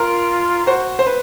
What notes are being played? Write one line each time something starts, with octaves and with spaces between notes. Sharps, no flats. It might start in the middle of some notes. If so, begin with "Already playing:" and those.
Already playing: F4 A#4
F#4 C5
C5
B4